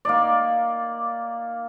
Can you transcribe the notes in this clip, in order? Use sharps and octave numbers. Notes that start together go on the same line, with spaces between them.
A#3 D#4 D5